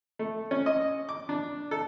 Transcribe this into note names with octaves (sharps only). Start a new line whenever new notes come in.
A3
C#4
D#5
D6
D4
A4